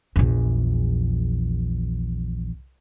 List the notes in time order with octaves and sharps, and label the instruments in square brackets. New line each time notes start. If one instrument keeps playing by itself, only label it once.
[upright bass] A#1 E2